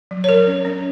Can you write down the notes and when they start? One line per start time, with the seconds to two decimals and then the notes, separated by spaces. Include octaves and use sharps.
0.11 F#3
0.24 C#5
0.29 F#3 A#4
0.47 C#4
0.65 C#4